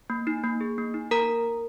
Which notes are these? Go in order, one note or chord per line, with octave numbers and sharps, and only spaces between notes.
A#3
D#4
A#3
G#4
A#3
D#4
A#3 A#4 A#5